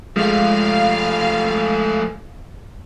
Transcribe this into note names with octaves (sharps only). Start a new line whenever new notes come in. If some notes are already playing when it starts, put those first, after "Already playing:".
F3 G#3 A3 F5